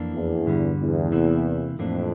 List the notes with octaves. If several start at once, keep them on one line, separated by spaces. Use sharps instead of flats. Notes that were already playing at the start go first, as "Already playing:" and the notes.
Already playing: F2 E3 A#3 D4
E2
G2 D3 G3
E2
C3 E3 A#3 E4
F2 A2 E3 A#3 D4